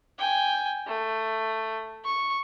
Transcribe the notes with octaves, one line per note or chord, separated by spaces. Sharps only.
G5 G#5
A3
C#6